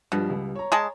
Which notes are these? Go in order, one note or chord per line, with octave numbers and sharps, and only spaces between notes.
G2 B2 F3 G3
C#2 G3
C#5 A#5
G#3 G#4 A5